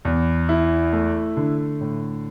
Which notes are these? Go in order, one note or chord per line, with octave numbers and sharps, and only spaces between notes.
E2
E4
A3
D3
A2